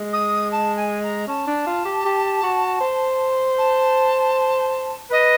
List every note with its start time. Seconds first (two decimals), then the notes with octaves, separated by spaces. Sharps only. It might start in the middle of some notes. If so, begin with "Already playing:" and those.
Already playing: G#3
0.13 D#6
0.51 A5
0.76 G#5
1.03 A#5
1.28 C#4 A5
1.47 D4
1.67 F4
1.85 G4
2.05 G4
2.43 F#4
2.81 C5
3.58 A5
5.11 B4 D#5